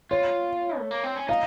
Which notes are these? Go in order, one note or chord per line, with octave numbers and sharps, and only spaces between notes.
F4 C#5
A3
A#3
C4
C#4
D#4 F5